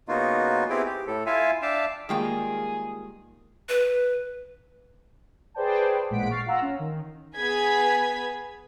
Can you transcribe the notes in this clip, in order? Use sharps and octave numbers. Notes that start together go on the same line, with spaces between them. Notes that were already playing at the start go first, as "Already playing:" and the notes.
C#3 A#3 B3 D#4 F4 F#4
B3 C4 E4 G4 G#4 G5
G4
A2 A4
E4 F4 E5 F5 G#5
D4 E5 F5 G5 A5
D#3 G3 G#3 A#3 F4 G#4 G5
B4
G#4 B4 C5 D5 G5 A5
A1 A#2 G#3 F#5 B6 D7
C#6 F6 A6 C7
F4 F#5 A#5 E6
C#4
D#3
B3 G#4 B4 G#5 G#6 B6